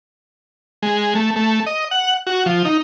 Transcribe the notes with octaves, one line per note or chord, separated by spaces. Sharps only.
G#3
A3
A3
D#5
F#5
F#4
F3
D#4